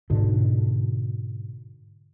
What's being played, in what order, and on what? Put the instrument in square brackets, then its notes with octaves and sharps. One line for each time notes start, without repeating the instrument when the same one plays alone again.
[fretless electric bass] G#2 B2 D3